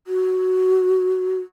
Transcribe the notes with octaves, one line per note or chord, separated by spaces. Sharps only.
F#4